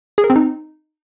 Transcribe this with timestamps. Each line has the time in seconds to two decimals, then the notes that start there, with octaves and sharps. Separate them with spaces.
0.18 G#4
0.24 A#4
0.30 C4
0.36 D#4